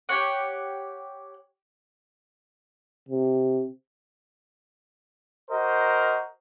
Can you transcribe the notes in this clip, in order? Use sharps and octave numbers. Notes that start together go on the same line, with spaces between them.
G4 C#5 F#5
C3
F#4 A#4 C5 D#5